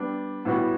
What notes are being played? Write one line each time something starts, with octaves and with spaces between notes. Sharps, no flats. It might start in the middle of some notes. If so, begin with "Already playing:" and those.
Already playing: G3 B3 D4
A2 G3 B3 F#4